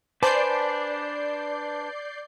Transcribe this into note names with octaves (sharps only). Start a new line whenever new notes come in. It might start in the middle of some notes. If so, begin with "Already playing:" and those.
D4 B4 C5 D5 G#5 A5 G6 C7